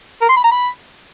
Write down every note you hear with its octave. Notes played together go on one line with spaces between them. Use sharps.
A#4
C6
B5
A#5
B5